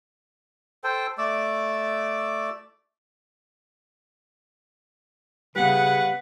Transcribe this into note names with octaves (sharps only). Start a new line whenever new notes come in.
A4 C5 G5
A3 D5 D6 E6
C#3 G3 B3 B4 F#5